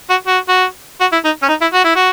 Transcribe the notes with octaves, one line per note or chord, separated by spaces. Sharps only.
F#4
F#4
F#4
F#4
E4
D#4
C#4
D#4
E4
F#4
E4
F#4